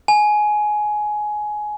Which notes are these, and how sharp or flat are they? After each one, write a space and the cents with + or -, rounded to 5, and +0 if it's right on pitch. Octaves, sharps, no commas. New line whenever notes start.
G#5 +15